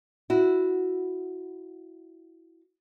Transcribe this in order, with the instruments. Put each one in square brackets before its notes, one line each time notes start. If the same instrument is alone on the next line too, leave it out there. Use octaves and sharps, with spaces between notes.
[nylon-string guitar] E4 F#4